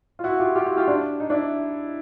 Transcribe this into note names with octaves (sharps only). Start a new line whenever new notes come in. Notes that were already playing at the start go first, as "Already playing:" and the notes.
F4
E4 F#4
F4 G4
F4 G4
E4 F#4
F4 G4
D4
D#4
D4 E4